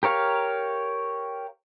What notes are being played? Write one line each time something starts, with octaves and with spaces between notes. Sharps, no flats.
G4 A#4 C#5 F5